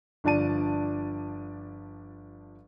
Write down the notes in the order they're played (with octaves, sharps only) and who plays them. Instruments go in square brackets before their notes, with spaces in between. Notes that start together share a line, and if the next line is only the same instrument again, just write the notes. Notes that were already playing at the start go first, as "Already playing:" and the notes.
[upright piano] G1 F3 D4 D5 A5 D#7